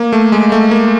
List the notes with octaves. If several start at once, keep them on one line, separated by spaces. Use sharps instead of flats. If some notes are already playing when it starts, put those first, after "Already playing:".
Already playing: A#3
A3
G#3
A3
A#3